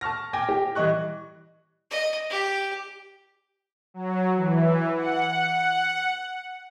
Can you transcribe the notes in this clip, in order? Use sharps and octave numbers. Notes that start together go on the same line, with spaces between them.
A5 C#6 F6 A#6
G5 G#5 D6 A#6
G4
E3 G3 D#5 C#6 F#6
D#5
G4
F#3
E3
F#5